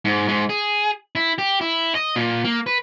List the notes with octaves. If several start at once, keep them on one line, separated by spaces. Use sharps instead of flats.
G#2
G#2
G#4
E4
G4
E4
D#5
A#2
A#3
B4